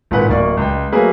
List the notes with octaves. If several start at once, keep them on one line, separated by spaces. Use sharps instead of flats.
G#1 A#2 B4 F#5
D1 A#3 D5 C#6
C#2 G5
F#3 A3 A#3 G#4 B4